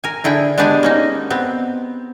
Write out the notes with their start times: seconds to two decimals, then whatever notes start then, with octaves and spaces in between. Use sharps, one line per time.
0.04 A#4 G#5
0.24 D3 E4 G#4 G5
0.58 G#3 B3 D4 G4 G#4 G#5
0.83 A#3 C#4 D#4
1.30 B3 C4